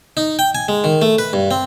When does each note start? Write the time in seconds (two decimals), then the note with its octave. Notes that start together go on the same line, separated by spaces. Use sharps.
0.17 D#4
0.39 G5
0.55 G#5
0.68 G#3
0.84 D#3
1.02 A3
1.18 B4
1.33 G2
1.51 C4